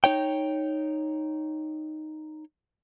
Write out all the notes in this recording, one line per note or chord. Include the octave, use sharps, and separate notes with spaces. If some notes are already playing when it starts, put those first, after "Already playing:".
D#4 C#5 G5